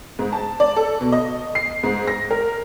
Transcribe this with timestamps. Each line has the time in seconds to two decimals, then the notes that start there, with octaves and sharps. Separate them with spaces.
0.19 G#2
0.33 A5
0.60 D5
0.77 A4
1.01 B2
1.12 D#5
1.55 C7
1.83 G#2
2.08 A#6
2.31 A#4